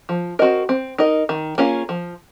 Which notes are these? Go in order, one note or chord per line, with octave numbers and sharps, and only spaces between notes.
F3
C4 F#4 A#4 D#5
C4
D#4 A#4 D#5
D#3
A#3 C#4 F4 G#4
F3